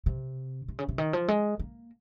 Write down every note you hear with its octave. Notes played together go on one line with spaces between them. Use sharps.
C3
C3
C#3
C3
D#3
F3
G#3
A#3